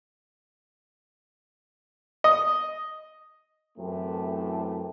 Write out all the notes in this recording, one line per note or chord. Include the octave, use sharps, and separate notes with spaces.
D#5
F#2 A2 C3 E3 A3